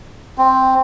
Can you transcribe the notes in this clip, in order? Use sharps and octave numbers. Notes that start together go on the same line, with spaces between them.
C4